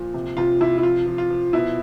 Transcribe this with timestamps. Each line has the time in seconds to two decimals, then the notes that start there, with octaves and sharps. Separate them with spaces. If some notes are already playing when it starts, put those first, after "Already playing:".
Already playing: A#2 F3
0.14 C3
0.37 C3 F4
0.61 C3 E4
0.78 E4
0.83 F3 F4
1.06 F3
1.18 F4
1.30 F3
1.53 B2 E4